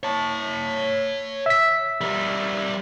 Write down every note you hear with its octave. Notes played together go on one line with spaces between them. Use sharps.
C#5 A5
E5 B6
G3 A#4